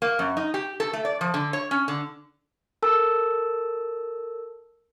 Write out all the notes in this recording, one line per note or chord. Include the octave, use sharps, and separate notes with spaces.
A#3
F#2
D#4
G4
A4
A3
D5
F3
D3
C#5
C#4
D3
A4 A#4 A5 E6